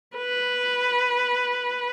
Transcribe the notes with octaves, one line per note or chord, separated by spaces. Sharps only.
B4